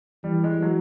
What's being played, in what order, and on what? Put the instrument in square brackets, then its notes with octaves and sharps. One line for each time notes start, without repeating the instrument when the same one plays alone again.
[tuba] E3 [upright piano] G3
[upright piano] G#3
F#3